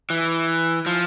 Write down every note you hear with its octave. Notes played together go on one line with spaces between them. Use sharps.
E3
F3